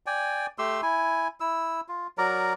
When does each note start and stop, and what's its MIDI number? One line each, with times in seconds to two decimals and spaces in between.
0.06 0.46 74
0.06 0.46 79
0.06 0.46 80
0.58 0.81 57
0.58 0.81 67
0.58 0.81 84
0.58 0.81 88
0.83 1.28 64
0.83 1.28 80
1.40 1.81 64
1.40 1.81 88
1.88 2.07 65
2.18 2.53 54
2.18 2.53 70
2.18 2.53 74
2.18 2.53 82